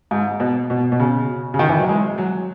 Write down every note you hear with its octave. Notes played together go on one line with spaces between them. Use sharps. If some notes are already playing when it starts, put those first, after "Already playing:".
G#2
B2
B2
B2
C#3
C#3
D#3
E3
F#3
G#3
F#3